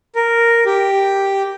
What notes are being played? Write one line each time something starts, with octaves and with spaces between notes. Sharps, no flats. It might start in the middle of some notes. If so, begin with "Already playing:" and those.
A#4
G4